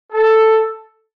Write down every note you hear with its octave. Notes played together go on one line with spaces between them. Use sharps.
A4